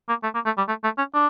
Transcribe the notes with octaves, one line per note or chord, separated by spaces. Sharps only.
A#3
A3
A#3
A3
G3
A3
A3
C#4
D4